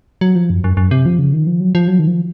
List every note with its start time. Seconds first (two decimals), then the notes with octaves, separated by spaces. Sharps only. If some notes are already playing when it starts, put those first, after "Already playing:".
0.21 F#3
0.35 F3
0.50 F#2
0.64 F#2
0.77 F#2
0.91 C3
1.06 F3
1.19 C#3
1.33 D#3
1.47 F3
1.60 F#3
1.75 F3
1.88 F#3
1.99 D#3
2.07 F3